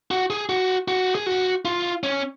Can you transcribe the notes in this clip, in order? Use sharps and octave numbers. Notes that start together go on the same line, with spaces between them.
F#4
G#4
F#4
F#4
G#4
F#4
F4
C#4